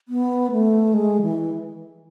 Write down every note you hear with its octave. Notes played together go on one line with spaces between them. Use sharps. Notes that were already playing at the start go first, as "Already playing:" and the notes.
B3
A3
G#3
E3